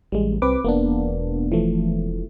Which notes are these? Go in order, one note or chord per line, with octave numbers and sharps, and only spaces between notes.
A1 G3 G#3
C2 C4 B4 D6
E1 A#3 B3 D4
E3 F3 A3